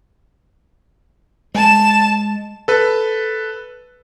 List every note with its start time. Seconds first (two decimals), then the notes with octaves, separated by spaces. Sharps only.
1.55 G#3 A5 E7
2.68 A4 B4